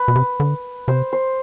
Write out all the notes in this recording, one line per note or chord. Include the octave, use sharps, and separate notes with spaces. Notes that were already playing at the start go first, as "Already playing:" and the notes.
Already playing: B4
B2
C3
D3
C3 C5
C5